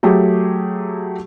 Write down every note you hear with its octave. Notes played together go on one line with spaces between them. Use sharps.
F#3 A3 G4 G#4